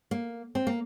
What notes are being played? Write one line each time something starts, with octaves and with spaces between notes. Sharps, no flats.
A#3
C4
A#3